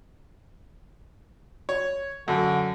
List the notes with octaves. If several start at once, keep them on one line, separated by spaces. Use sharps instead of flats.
C#5
F#2 D3